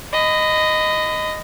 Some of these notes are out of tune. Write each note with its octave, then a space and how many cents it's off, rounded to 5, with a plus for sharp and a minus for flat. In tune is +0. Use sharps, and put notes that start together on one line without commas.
D#5 -5 B5 +30